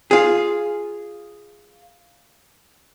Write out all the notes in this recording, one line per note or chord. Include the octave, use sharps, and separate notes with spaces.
F4 G#4